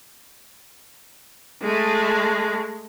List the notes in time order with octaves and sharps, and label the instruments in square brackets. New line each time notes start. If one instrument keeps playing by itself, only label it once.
[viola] G#3 A3